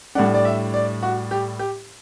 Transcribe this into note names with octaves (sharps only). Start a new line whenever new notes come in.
A2 G3 D4 F#5
D5
E5
D5
F#4
G4
G4